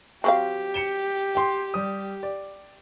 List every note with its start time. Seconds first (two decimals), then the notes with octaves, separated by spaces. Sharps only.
0.24 F#3 C4 G4 F5
0.74 C#7 E7 G7
1.35 G5 C6
1.74 G3 D#6
2.23 D5